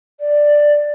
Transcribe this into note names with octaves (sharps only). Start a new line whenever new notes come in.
D5